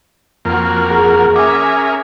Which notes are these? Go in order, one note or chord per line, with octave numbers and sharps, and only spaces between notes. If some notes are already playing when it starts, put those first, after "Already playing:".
F2 A#3 F#4 A#4
G#4 A#5
C#4 G#4 A#4 E5 G#5 D6